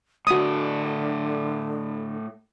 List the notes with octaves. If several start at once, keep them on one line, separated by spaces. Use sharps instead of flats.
A2 D3 D4 F#4 D#6